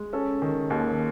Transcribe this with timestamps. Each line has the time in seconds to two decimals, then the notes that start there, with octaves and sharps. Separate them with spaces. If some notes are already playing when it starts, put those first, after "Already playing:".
Already playing: G#3
0.13 C#4 A4
0.42 D#3
0.70 D#2